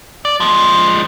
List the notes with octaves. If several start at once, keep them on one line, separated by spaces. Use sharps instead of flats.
D5
F3 G#3